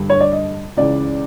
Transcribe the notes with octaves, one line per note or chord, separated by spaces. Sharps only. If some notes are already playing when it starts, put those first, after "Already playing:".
Already playing: G2 D3 G3
C#5
D5
D#5
C#2 C#3 E3 D5